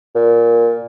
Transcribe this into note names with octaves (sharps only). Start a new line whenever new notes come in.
A#2